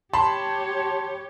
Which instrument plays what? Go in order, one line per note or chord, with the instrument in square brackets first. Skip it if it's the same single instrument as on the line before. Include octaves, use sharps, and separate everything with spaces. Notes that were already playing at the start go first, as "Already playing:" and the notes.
[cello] G4 C#5 [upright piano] A5 B5 C6